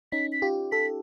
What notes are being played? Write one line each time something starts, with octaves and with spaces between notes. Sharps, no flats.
C#4 D#4 B6
B6
F4 G4
A4 B6